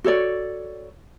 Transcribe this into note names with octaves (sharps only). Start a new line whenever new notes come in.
F#4 A4 C#5 D5